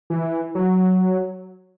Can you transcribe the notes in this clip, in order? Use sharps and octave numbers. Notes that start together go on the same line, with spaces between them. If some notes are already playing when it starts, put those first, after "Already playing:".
E3
F#3